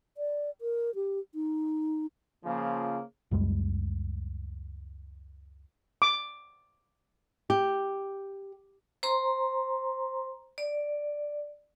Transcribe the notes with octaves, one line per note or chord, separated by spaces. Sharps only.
D5
A#4
G4
D#4
C#3 F3 A#3
C#2 F#2 G3 G#3
D6
G4
C5 A#5 C6
D5